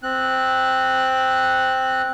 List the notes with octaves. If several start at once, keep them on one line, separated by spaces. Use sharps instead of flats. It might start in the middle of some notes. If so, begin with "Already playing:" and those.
C4 F#6